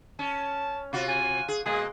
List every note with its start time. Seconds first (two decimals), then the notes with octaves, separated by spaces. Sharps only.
0.19 C#4 A5
0.93 C3 F4 F#4
1.08 G#5
1.48 G#4
1.66 B2 G#3 A#3 G#4